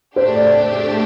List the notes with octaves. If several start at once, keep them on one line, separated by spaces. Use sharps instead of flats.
A2 A3 D4 G4 C5
D5